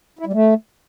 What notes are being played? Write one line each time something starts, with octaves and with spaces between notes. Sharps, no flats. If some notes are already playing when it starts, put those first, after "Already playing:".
E4
G3
A3